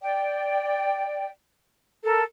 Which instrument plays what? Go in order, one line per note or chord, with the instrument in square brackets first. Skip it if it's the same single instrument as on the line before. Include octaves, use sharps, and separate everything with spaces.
[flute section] D5 G5
A4 A#4